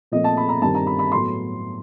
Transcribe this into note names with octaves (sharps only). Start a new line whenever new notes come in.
A#2 F3 A3 C4 D#5
A5
B5
A#5
G2 D#3 G3 C4 A5
A#5
B5
B5
A2 F#3 B3 C6